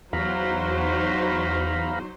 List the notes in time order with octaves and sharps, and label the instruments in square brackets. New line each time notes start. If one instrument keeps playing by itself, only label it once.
[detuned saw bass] E2 [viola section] F#3 D#4 C5 [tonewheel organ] F5 A#5 B5